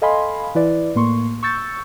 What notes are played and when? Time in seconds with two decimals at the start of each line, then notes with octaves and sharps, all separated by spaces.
0.02 A4 D#5 F5 G#5 B5 C6
0.55 E3 E4 B4 D5
0.95 A2 A#3 C6 C#6
1.43 C#6 E6 G6 A6 C#7